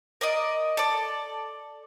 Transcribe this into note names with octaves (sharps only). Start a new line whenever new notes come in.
A#4 D5 D#5
A4 D5